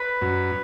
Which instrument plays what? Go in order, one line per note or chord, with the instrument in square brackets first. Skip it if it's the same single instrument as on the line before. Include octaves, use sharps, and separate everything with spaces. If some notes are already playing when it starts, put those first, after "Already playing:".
Already playing: [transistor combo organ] B4
F#2